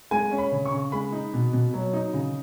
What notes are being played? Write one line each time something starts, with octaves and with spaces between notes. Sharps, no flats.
G#3 G#5
C#4
B5
C#3
C#6
C#3
G#3 B5
D#4
B2
B2
F#3
D#4
C#3